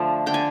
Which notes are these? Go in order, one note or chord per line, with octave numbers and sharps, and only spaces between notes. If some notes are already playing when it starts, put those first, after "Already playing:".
Already playing: D3 F3 A3
D3 G5
G#5